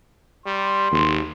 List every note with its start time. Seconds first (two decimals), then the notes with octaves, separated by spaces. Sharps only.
0.46 G3 C6
0.92 G#1 D#2